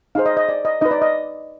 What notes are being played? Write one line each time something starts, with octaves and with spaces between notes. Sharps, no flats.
D#4 G#4 C5 F5
D#5
D#5
D5
D#5
D#4 B4 D#5
D5
D#5